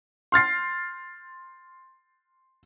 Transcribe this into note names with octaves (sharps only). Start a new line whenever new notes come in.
C6 F6 A6 C7